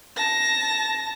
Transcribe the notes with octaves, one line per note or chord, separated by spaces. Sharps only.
A5 A#6